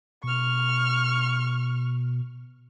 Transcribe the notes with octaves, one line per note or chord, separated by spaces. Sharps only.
B2 C#6 F6